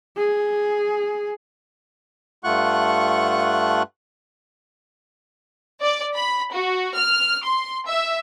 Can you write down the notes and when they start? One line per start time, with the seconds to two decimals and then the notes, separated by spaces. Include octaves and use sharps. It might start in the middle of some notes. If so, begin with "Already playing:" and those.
0.17 G#4
2.44 G2 A3 F4 F#5 C#6 F#6
5.82 D5
6.16 B5
6.52 F#4
6.97 F6
7.45 C6
7.87 E5